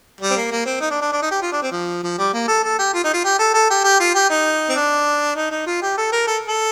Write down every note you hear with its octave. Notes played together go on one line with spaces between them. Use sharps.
G3
C4
A#3
A#3
C4
D#4
D4
D4
D4
D#4
G4
F4
D4
C4
F3
F3
G3
A#3
A4
A4
G4
F4
D#4
F4
G4
A4
A4
G4
G4
F4
G4
D#4
C4
D4
D#4
D#4
F4
G4
A4
A#4
A4
A4